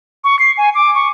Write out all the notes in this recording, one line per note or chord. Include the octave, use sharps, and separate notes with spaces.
C#6
C7
G#5
D6
C#6